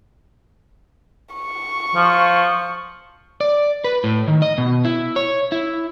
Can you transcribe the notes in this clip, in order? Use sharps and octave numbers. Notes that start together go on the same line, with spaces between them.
C#6
F3
D5
B4
A2
D#3
D#5
B2
E4
C#5
E4